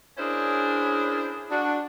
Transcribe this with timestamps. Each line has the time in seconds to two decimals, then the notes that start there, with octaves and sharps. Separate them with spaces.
0.18 C#4 D4 E4 G#4 A#4 C5
1.50 D4 F#4